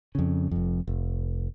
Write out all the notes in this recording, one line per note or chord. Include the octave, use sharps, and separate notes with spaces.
F2 C#3
F1 F2
F1